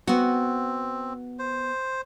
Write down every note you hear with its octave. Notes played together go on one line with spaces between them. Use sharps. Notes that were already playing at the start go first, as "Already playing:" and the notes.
B3 C4 F#4
C5